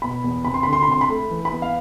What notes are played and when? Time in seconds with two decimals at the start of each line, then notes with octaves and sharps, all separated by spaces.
0.02 B2 B5
0.24 E2
0.45 C3 B5
0.54 C6
0.63 D2 B5
0.73 C6
0.82 B5
0.87 C3 C6
1.01 B5
1.09 A3
1.30 E3
1.45 B5
1.52 B3
1.62 F5